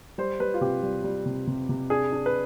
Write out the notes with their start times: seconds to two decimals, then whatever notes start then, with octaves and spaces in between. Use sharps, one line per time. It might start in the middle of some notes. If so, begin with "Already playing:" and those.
0.18 G3 C5
0.40 G3 B4
0.54 F4
0.61 C3 G4
0.82 G3
1.04 G3
1.26 C3
1.47 C3
1.69 C3
1.90 D4 G#4
2.12 D4
2.26 B4